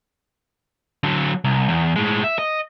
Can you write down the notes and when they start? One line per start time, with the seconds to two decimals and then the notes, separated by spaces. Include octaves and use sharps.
1.03 D3 F#3
1.44 C2
1.69 E2
1.96 A2 G#3
2.24 E5
2.38 D#5